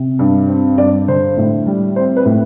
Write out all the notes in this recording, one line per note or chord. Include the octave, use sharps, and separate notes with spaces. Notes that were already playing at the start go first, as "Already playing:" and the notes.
Already playing: C3
G2
C4
G2 D5
D3 C5
A2
G3
C4 C5
B4
A2